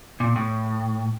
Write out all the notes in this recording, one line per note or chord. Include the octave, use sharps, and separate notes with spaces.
A#2
A2